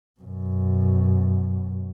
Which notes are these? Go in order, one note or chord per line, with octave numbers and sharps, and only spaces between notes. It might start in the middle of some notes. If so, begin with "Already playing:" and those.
F#2 B2